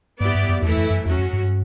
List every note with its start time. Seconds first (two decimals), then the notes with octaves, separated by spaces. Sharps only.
0.21 G2 B3 E4 G4 D5
0.35 G2
0.49 F#2
0.62 E2 E3 A3 E4 A4
0.77 F#2
0.91 F#2
1.05 E2 F#3 C#4 F#4
1.19 F#2
1.33 G2